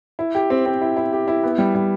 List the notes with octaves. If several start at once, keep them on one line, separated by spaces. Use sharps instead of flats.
E4
G4
C4
C4
E4
E4
G4
E4
B3
G3
G3